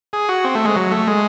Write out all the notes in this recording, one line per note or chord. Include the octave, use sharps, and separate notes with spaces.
G#4
F#4
C4
A3
G#3
F#3
A3
G#3